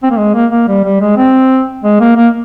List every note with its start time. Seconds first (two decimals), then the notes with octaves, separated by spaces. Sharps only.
0.03 C4
0.11 A#3
0.18 G#3
0.34 A#3
0.51 A#3
0.68 G3
0.84 G3
1.01 G#3
1.17 C4
1.84 G#3
2.00 A#3
2.17 A#3